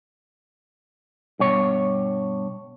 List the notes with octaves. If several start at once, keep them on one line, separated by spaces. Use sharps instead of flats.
G2 B2 C#5